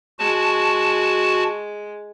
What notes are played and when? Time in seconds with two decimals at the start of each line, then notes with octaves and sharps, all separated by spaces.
0.19 G#3 F#4 A5